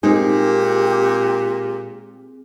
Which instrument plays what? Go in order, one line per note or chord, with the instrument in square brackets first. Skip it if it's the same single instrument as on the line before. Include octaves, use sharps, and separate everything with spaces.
[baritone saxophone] A#2 [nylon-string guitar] G#3 D#4 [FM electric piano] C4 G#4 [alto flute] G4